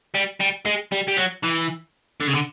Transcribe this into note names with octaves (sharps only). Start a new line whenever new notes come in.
G3
G3
G#3
G3
G3
F#3
E3
D3
C#3
D3